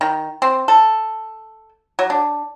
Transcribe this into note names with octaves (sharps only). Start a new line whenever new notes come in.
D#3
C4
A4
F#3
D4